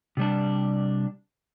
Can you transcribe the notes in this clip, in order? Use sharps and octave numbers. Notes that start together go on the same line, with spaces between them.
C3 G3 D4